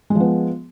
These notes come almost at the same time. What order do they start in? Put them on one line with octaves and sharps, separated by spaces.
G#3 F3 B3